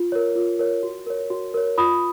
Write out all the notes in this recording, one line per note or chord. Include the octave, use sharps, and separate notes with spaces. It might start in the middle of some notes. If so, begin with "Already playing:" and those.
Already playing: F4
A#4 C#5
F4
A#4 C#5
F#4
A#4 C#5
F#4
A#4 C#5
F4 B5 D#6